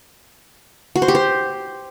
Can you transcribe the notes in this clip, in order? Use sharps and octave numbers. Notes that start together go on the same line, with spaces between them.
F#4
C5
G4
C5